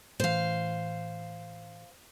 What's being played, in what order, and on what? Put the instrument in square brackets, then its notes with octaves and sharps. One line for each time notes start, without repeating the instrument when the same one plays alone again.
[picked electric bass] A2 E3 [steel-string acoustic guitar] C5 F5